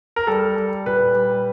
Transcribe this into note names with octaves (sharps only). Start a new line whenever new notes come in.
A#4
G3 A4
G3
A#2 B4
G3